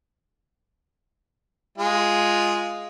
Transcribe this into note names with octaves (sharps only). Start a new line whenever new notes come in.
G#3 F4